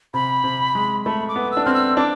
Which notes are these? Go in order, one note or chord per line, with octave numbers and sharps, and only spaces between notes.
C3 B5
C3
G#3
A3 B5
D6
B3
E6
D4
C4 F6
E6
D4 D6